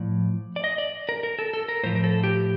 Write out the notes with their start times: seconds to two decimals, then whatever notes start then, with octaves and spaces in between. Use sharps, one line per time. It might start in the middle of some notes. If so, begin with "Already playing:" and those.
Already playing: A2 F3 D5
0.56 D5
0.64 D#5
0.78 D5
1.09 A#4
1.23 A#4
1.39 A4
1.54 A4
1.68 A#4
1.83 A2 F3 C5
1.95 A#4
2.04 A4
2.24 G4